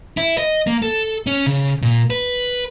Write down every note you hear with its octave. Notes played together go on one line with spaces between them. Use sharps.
E4
D#5
A#3
A4
C#4
C#3
A#2
B4